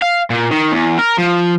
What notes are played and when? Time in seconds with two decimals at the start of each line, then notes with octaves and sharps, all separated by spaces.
0.02 F5
0.30 A#2
0.51 D#3
0.72 E2
0.99 A#4
1.18 F3